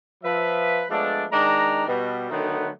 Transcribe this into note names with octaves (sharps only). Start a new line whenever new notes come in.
F3 B4 E5
F3 G#3 A3 B3 D4
D#3 G#3 D4 A#5
B2 G3
D3 D#3 F#3 A3 B3 D#4